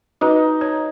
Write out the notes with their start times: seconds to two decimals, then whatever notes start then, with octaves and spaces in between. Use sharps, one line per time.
0.21 D#4 F#4 B4
0.61 C#5